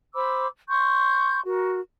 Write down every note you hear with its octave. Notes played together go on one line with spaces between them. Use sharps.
C5 B5 D6 E6
C6 C#6 G6
F#4 A#4